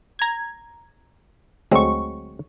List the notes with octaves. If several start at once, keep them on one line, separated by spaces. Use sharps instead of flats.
A#5 G#6
D2 F#3 G#3 C4 C#6